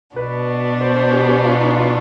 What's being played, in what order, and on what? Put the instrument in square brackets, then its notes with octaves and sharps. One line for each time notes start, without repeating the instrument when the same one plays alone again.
[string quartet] B2 B3 D4 [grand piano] B4
[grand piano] C5
C5
G4
G4
F4
D#4
F4